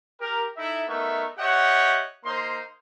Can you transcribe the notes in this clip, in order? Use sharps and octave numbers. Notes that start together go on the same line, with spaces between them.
G4 A#4
D#4 E4 A4 E5
A3 B3 D#4 A#4 E5 C#6
G4 C#5 D#5 E5 F#5
A#3 D#4 C5 C6